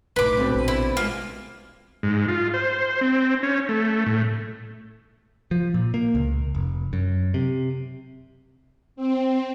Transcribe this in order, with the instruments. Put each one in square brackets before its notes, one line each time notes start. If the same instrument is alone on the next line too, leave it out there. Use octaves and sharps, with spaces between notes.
[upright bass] B1 A2 [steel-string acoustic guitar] D#4 [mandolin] B4 D6
[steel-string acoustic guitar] B2 D3 C4
[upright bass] A#1 B3
[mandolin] E4
[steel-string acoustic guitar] G#3 F4 [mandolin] A#3
[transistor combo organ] G#2
F4
C5
C4
C#4
A3
A2
[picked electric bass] F3
A#2
A#3
C#2
F1
F#2
C3
[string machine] C4